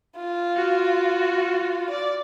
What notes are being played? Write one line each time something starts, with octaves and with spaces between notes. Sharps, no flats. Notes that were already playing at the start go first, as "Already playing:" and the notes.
F4
F#4
D5